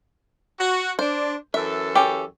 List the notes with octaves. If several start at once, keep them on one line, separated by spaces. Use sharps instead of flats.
F#4
D4 C5
F#2 E3 A4 E5
C#4 G4